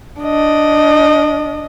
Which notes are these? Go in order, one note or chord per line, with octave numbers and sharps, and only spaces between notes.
D4 D#5